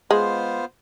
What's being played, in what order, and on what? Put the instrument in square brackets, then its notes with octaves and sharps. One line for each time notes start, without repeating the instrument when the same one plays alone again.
[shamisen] G#3 [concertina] B3 F4 C5